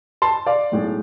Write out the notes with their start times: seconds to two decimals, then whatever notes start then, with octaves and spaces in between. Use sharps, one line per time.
0.22 A5 C6
0.46 D5 F5
0.72 B1 A2 G#3